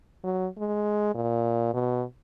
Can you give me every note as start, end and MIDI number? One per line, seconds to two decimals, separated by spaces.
0.23 0.47 54
0.58 1.12 56
1.15 1.71 46
1.73 2.03 47